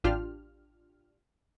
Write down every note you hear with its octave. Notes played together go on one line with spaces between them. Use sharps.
A1 D4 F4 G4 F6